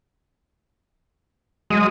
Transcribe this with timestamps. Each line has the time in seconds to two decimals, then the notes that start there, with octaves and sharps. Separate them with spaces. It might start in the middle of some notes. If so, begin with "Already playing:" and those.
1.70 F#3 G#3 D#5 D#6